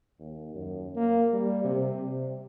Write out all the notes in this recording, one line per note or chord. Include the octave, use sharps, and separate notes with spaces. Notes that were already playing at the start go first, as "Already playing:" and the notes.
D#2
F#2
A#3
G3
C3
C3